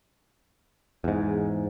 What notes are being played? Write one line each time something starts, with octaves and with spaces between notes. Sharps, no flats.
E2 G#2